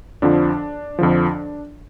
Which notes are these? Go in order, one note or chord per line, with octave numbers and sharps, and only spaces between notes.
F2 D3 F3 D4
F2 D3 F3